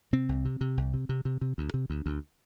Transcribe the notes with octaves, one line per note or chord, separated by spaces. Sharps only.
C3 C4
C2
C3
C3
C2
C3
C3
C3
C3
D2
C3
D2
D2